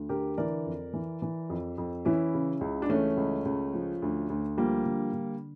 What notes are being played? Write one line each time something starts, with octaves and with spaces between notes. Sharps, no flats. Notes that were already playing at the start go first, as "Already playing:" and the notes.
Already playing: D2
D3 G4 A#4
E3 A#4 D5
F2
E3
E3
F2
F2
E3 C#4 E4
C#3
C#2
D4
E3 A3 C#4
C#2
C#2
F3
D2
D2
F3 G3 A#3
D3
D3